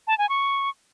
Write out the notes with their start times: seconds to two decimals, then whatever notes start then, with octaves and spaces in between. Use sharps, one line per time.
0.07 A5
0.18 G#5
0.29 C#6